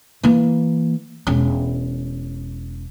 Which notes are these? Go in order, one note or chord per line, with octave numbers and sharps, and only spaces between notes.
E3 A#3
E1 C#4